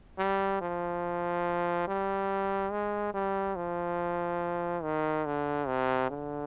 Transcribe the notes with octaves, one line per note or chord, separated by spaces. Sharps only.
G3
F3
G3
G#3
G3
F3
D#3
D3
C3
D3